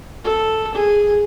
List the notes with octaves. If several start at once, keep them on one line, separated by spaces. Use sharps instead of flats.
A4
G#4